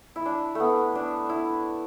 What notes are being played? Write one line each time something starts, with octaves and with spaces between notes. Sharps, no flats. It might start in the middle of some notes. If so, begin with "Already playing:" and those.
E4
D4
A3 B3
D4
E4